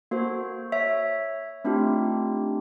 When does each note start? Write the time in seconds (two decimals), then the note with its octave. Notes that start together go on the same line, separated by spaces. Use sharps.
0.11 A#3 F#4 A4 C5
0.72 C#5 E5
1.64 A3 C4 D4 D#4 F4 G4